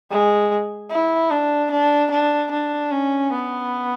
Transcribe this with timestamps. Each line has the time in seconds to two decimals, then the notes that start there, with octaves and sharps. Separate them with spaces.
0.11 G#3
0.91 E4
1.31 D4
1.71 D4
2.11 D4
2.51 D4
2.91 C#4
3.32 B3